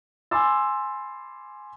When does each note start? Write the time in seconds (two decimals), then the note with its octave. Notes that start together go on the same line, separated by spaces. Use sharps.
0.31 G#5 B5 C6 D6 E6 A6